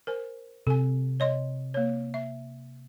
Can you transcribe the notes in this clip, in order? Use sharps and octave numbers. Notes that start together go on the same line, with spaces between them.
A#4 C5 G#5
C3 A4 G#5
C#5 D#5 C6
A#3 C#5
E5